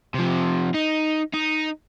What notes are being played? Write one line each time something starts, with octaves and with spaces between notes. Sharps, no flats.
C3 F3
D#4
D#4